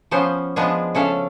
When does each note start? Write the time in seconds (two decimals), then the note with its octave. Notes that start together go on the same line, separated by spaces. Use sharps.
0.11 F3 B3 C#4 C5
0.56 F3 G#3 B3 D4 G#4
0.95 C#3 A3 C#4 D4 A4 F5